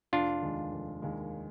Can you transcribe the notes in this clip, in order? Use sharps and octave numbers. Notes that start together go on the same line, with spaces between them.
F1 D4 F4
D#2 D#3 G#3
F1
D#2 D#3 G#3